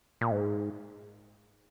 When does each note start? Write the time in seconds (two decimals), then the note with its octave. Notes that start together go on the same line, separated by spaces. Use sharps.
0.21 A#2
0.31 G#2